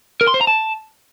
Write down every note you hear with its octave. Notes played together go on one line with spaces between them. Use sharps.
A#4
C6
C5
A#5
A5